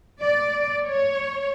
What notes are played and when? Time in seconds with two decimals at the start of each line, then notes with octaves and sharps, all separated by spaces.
0.20 D5
0.88 C#5